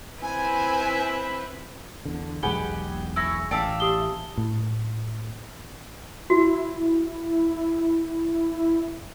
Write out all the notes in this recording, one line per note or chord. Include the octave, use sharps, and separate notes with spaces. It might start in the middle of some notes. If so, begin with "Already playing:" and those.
C4 E4 B4 G#5
E2 D3
E1 B1 G#3 G4 G#4 B4 F#5 G7
E4 C#6 E6 A#6
A1 D5 E5 F5 G5 A5 E6
G4 D#6 G7
A2
E4 F#4